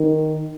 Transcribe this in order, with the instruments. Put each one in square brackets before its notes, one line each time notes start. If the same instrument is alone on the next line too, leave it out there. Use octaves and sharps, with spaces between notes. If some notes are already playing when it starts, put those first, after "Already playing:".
Already playing: [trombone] D#3